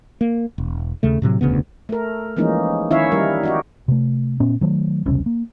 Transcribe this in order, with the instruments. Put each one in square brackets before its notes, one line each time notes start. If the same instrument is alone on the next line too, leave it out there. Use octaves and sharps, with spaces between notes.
[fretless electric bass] A#3
E1
D#2 C#3 A3
A2 C3 E3 F#3
E1 D2 C#3 B3
[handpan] A3 A#4
E3 F3 G#3 A#3 C#4 D#4
D#3 C#4 E4 C#5 E5 F5
G3 D#4 A#4
D#4 F#4 G4
[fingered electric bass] C3 A3
A#2 B3 C#4
D#3 F#3 G#3 A3
E1 C2 C#3 C#4
A#3